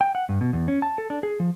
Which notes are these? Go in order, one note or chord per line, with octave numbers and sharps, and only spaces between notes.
G5
F#5
G2
B2
E2
C#4
A5
A4
D4
G#4
F3